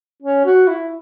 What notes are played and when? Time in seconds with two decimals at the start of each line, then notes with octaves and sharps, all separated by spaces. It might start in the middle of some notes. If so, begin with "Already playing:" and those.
0.23 C#4
0.45 F#4
0.67 E4